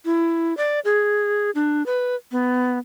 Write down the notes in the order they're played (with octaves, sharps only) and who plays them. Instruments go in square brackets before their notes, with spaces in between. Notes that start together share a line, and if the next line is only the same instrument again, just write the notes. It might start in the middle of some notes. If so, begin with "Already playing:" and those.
[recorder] E4
D5
G#4
D4
B4
B3